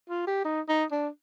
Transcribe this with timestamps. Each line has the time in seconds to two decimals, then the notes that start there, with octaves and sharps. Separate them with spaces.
0.10 F4
0.27 G4
0.45 D#4
0.68 D#4
0.91 D4